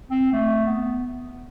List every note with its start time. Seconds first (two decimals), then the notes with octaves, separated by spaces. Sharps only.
0.11 C4
0.33 A3
0.66 B3